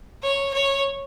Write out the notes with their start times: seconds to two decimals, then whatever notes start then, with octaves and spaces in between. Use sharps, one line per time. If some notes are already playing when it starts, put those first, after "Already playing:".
0.23 C#5
0.54 C#5